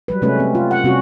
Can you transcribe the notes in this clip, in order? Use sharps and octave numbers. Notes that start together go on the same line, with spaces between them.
F#3 G3 B4
C3 G#3 A3 C#4 B4
C4
F4
F#5
C3 G3 C4 C#4 F#4